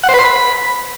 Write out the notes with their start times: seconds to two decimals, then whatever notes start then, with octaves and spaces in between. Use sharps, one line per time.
0.04 F#5
0.09 C5
0.14 B4
0.19 C6
0.24 B5